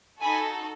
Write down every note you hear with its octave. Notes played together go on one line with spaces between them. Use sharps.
D#4 F#4 A4 G#5 B5